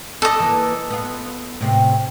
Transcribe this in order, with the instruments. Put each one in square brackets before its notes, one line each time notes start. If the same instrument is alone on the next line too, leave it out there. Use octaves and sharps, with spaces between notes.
[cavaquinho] A4 D#5 [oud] D5
[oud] E3 A#3 B3
B3 F4
A2 C3 C4